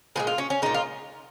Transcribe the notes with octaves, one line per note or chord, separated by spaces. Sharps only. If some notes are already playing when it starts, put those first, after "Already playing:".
A#2 F3 G#3 G#4
F4
C#4
C#4
A#2 G#3 D#4
F4